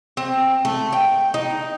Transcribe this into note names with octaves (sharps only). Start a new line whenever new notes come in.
C4
A3
G5
D#4